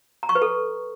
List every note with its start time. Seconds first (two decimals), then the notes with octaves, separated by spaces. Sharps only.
0.23 A#5
0.29 C#6
0.35 B4
0.42 A4